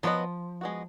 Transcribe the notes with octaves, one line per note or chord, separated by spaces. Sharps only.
F3 F#3 B3 F#4 B4 D#5
G#3 B3 F#4